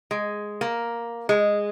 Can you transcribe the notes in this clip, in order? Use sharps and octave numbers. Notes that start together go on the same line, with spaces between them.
G#3
A#3
G#3